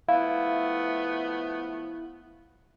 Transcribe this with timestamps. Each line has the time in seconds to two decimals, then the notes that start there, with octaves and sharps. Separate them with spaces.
0.08 F3 A3 B3 E4 F5